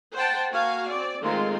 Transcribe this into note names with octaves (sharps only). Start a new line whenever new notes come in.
C5 F#5 G5 A5
A#3 F#4 F5 G#5
C4 D5
D#3 G#3 A3 C4 F4 C6